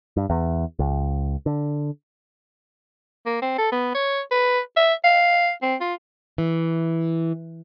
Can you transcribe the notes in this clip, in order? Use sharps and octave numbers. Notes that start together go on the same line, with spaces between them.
G2
E2
C#2
D3
A#3
C4
A4
B3
C#5
B4
E5
F5
C4
F4
E3